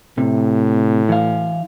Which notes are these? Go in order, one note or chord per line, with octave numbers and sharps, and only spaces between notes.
A2 C3
E3 F5